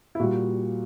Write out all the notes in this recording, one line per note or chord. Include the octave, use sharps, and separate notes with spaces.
E4
A#2 G3 F#4